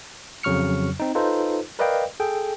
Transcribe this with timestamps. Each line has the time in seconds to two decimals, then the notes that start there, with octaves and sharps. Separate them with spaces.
0.43 F2 C#3 F#3 C#6 F6 C#7
1.00 C4 D#4
1.15 D#4 F4 A4 B4 C5
1.79 A#4 B4 D5 D#5 F5 G5
2.20 G#4 A4 G5